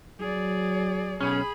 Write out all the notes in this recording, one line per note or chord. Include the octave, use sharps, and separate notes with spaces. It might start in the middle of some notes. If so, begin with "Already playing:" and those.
F#3 G#4 D5
B1 C#4 G#4 B5